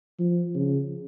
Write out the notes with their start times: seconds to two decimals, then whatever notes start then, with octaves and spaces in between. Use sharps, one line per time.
0.19 F3
0.55 C#3